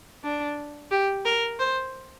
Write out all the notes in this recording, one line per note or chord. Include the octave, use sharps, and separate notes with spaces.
D4
G4
A#4
C5